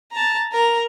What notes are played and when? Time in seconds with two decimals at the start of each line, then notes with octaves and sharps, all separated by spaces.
0.12 A5 A#5
0.52 A#4 A#5